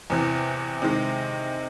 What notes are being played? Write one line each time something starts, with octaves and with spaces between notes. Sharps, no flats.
E2 C3 E3
C3 D#3 G#3